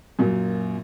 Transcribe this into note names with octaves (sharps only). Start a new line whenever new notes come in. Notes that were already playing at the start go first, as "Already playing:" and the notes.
F#2 A#2